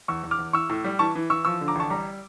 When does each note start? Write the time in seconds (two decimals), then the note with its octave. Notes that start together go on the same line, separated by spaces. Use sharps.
0.08 E2 C#6 E6
0.24 E2
0.31 D6 F6
0.39 E2
0.53 E3 C#6 E6
0.70 A2
0.85 G3
0.99 E3 A5 C#6
1.15 E3
1.30 E3 C#6 E6
1.45 F3 C#6 E6
1.61 D3
1.68 A#5 D6
1.75 A1 A5 C#6
1.90 G3 A#5 D6